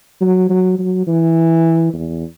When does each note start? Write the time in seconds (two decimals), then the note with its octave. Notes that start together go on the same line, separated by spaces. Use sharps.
0.21 F#3
0.49 F#3
0.79 F#3
1.07 E3
1.94 E2